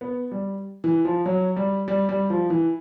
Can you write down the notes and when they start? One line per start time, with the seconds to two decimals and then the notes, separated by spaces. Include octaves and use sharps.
0.01 B3
0.32 G3
0.84 E3
1.05 F3
1.26 F#3
1.57 G3
1.88 G3
2.09 G3
2.30 F3
2.50 E3